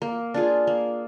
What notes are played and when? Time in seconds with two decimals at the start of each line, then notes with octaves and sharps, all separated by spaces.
0.02 A#3
0.34 D4 F4 G#4
0.67 A#3